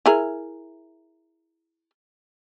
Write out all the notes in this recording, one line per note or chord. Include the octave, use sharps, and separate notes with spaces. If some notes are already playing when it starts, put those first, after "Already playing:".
E4 G#4 A#4